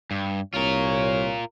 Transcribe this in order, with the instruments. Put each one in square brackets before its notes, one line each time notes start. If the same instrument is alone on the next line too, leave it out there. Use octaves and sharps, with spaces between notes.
[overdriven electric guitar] G2
[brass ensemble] C2 C#5 [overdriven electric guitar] F4 A#4